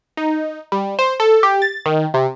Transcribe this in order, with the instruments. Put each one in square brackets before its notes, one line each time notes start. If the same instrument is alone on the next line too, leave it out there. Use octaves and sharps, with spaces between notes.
[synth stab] D#4
G3
C5
A4
G4
A6
D#3
C3